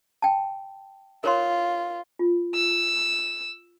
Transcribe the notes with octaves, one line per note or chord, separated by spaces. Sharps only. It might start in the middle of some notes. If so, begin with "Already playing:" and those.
G5 A5
F4 A#4 C#5 C6
F4
E6